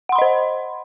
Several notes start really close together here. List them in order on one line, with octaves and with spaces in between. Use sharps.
F#5 C6 B5 D#5 C5